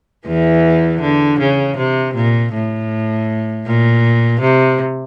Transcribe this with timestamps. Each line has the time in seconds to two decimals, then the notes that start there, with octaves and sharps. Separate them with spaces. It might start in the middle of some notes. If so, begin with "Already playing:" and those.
0.27 E2 E3
1.01 D3
1.39 C#3
1.77 C3
2.15 A#2
2.53 A2
3.66 A#2
4.41 C3